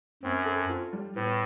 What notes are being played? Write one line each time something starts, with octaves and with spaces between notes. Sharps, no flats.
F#2 C4
A4
F4
G3
A2 B3